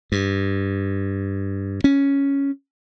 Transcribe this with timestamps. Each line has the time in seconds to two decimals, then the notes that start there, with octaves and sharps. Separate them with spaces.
0.12 G2
1.84 C#4